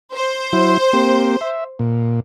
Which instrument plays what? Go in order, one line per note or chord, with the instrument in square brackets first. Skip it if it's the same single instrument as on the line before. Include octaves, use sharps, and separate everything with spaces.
[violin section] C5
[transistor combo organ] F#3 E4
A#3 C4 G4
E5
A#2